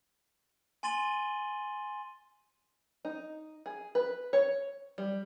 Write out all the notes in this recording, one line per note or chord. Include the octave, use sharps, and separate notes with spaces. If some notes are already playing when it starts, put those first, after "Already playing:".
G#5 C6 A6 D#7 F#7 G7
D#4
G#4
B4
C#5
G3